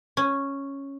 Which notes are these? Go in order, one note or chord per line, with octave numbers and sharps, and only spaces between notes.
C#4